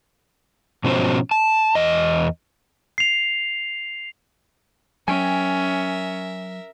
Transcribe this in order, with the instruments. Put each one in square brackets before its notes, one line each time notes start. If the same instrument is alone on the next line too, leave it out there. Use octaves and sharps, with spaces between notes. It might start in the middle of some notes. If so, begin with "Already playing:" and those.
[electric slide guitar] G#2 B2 F3 C#4 F#4 C5
A5
E2 D#5
[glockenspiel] C7 F7
[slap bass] F#3 [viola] C#4 [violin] A#4 E5 [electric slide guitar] G5 G#5